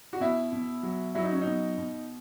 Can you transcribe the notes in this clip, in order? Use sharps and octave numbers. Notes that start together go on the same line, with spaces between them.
F#4
B2 E4
B2
F#3
F#3 E4
D#4
C#4
B2 D#4
B2